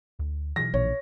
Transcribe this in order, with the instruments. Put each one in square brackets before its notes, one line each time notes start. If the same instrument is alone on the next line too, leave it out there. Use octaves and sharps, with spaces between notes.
[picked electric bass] D2
[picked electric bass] B2 E3 F#3 [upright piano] A#6
[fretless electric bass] A#1 [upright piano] C#5